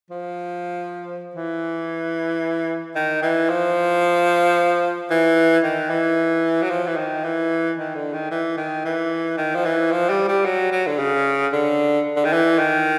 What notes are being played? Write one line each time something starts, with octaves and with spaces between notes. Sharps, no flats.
F3
E3
D#3
E3
F3
E3
D#3
E3
F#3
F3
E3
D#3
E3
D#3
D3
D#3
E3
D#3
E3
D#3
F3
E3
F3
G3
G3
F#3
F#3
D3
C#3
D3
D3
D#3
E3
D#3